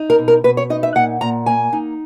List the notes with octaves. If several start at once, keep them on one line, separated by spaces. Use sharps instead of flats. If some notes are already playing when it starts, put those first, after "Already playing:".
Already playing: D#4
A#4
B2
A#4
B2 B4
C#5
D#4 D#5
E5
A#2 F#5
A#2 A#5
A#3 G#5
D#4